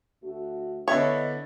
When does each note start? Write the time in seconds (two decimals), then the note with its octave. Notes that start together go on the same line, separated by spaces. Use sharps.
0.23 D2 A3 F#4
0.88 D3 B3 D4 E4 C#5 D#5